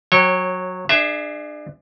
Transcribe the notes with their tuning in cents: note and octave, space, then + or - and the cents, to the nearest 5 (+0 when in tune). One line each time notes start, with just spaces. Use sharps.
F#3 -10 C#5 -25 G5 +0
D4 +35 G#4 +0 E5 +0